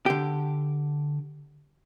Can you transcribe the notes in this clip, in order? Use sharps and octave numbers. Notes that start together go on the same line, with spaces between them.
D3 G4